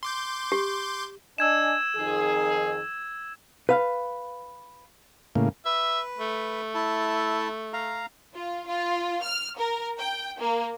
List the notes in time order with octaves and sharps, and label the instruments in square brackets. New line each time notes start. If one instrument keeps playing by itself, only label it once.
[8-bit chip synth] C6 D6 G6
[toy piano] G4
[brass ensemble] D4 D#5 G#5 [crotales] E6 G#6 E7
[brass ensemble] F2 D#3 G#4
[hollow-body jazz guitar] B4 F5
[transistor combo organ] A2 C#3 A#3
[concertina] B4 [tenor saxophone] E5
[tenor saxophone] A3
[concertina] E4 A5
F5 A#5
[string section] F4
F4
F6
A#4
G5
A#3